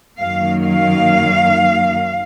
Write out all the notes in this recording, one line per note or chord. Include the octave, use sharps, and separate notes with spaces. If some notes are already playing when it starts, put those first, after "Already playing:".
F#2 D#3 F#3 A#3 F5
F5